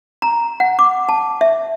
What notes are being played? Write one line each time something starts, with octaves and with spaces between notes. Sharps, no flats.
A#5
F#5
D6
A5
E5